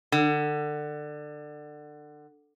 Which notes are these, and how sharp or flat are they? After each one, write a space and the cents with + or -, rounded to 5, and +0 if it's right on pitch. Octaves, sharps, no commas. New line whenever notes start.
D3 +25